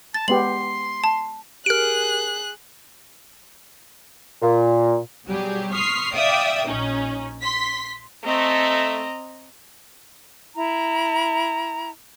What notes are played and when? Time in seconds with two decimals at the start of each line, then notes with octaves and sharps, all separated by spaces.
0.14 A5 A6
0.28 G#3 B3 G4 C6 F#7
1.04 A5
1.66 G4 G#4 A#4 F6 F#6 D7
4.42 A#2
5.26 B2 F#3 G3 G4 G#4
5.72 C6 C#6 D#6 F6 B6 C7
6.14 D5 E5 F5 G5 D#6
6.67 A#1 C#4 D#4
7.41 C6 B6
8.24 A3 C4 D#5 A#5
10.56 E4 A#5